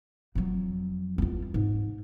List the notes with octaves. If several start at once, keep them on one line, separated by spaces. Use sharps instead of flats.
F2 F#3
E2 F4
G#2